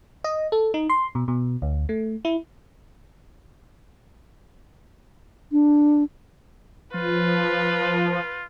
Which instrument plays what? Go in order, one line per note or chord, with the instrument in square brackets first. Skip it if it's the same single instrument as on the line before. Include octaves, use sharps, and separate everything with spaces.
[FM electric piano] D#5
A4
D#4
C6
B2
B2
D2
A3
E4
[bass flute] D4
[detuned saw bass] F3 [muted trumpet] F4 [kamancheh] B4